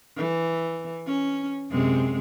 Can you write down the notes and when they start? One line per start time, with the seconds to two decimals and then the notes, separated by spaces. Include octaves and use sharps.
0.17 E3
1.07 C#4
1.70 F#2 C3 G#3